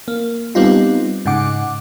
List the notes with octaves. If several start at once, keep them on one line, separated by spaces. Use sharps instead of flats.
A#3
G3 B3 C4 D#4 F4
G#2 C#3 F#5 D6